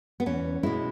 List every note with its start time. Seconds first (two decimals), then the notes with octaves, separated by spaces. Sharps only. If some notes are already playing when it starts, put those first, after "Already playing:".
0.20 B3
0.26 E2 C#4
0.63 B2 G#3 E4